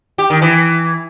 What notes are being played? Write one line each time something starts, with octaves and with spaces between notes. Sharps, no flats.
G4
D#3
E3